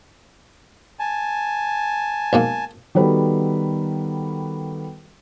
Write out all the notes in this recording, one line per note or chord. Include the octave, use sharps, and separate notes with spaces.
G#5 A5
B1 G#2 A#3
D#3 G3 B3 F#4 A4 B4